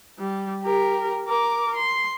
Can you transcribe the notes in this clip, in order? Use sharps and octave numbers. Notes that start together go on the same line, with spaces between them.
G3
G4 A#4
A#4 D6
C6